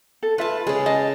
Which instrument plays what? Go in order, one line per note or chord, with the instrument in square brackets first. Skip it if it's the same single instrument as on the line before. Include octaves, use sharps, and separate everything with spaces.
[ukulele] A4
[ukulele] F4 E5 [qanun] B4 A5
[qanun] C#3 G#3 [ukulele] G#4
[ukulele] D#5 [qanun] A5